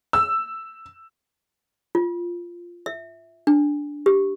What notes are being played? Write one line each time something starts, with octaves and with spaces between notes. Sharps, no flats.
E6
F4
E5
D4
G4